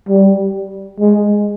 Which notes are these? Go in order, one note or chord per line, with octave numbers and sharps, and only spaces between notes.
G3
G#3